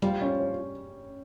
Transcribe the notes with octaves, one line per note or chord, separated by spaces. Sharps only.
F3 G3
C#4
C#5